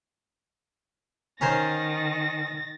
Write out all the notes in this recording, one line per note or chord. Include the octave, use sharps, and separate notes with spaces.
D#3 C#4 A#4 C5 A6 A#6